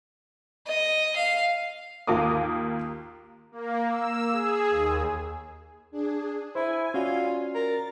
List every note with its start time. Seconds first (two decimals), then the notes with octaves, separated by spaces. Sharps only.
0.67 D#5
1.16 F5
2.07 D#2 F4 A#4 D6 D#6
3.52 A#3
3.87 E6
4.32 G#4
4.69 D#2
5.91 D4 G#4
6.55 E4 C5 G#5
6.94 C#4 F4 F#4 D5
7.55 A#4 A6